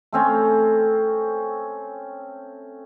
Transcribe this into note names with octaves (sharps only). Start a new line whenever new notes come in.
A3 C4 C#4